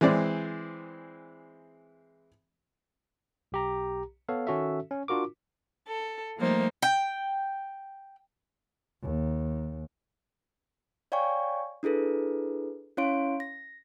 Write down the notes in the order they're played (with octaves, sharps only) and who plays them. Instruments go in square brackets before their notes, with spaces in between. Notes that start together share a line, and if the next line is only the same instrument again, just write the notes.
[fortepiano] E3 G#3 C4 D5
[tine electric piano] B1 G4 A#5
B3 A4 C#5 F5
D#3 C#4 F#4 A4 E5
C#4
D4 F4 F#4 A#4 D6
[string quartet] A4
F3 G3 A3 A#3 D#4 C5
[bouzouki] G5
[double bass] D#2
[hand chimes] C#5 D5 F5 G5 G#5 C#6
D4 E4 G#4 A4 B4
C#4 E4 C#5 F5 C6 D7
A#6